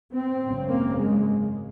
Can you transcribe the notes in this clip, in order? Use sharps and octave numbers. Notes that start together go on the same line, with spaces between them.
C4
G#1 F#2 C#3
A#3
G#3